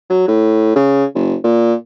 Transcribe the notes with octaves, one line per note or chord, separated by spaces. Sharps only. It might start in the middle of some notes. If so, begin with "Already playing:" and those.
F#3
A2
C#3
F#1
A#2